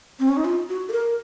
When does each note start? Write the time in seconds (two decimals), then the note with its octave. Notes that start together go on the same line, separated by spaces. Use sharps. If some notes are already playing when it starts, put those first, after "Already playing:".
0.19 C4
0.28 C#4
0.37 D#4
0.44 F4
0.69 F#4
0.89 A4
0.92 A#4